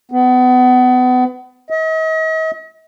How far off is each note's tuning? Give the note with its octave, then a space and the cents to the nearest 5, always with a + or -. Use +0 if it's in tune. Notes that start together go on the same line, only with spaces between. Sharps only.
B3 +30
D#5 +45